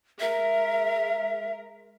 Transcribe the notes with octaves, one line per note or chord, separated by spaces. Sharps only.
G#3 A#4 E5